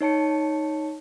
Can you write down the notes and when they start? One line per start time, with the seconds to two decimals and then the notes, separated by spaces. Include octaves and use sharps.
0.01 D#4 C#5 A5 C#7